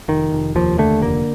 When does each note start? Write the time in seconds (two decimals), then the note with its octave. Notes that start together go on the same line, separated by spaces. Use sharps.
0.08 F1 D#3
0.32 F1
0.55 D#2 F3
0.78 D3 A3
1.01 F1 A#3